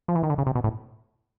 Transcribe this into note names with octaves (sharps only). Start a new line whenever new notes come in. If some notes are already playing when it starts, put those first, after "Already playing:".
F3
E3
D#3
D3
C#3
C3
B2
A2